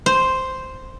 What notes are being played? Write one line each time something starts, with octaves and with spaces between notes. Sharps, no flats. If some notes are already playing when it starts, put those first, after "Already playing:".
C5